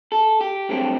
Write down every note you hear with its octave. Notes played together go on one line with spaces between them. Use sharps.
A4
G4
G2 F#3 A3 C4